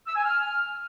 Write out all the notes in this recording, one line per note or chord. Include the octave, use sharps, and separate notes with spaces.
E6
G#5
F6